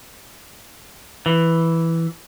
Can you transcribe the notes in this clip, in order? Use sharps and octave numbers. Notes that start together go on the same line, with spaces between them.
E3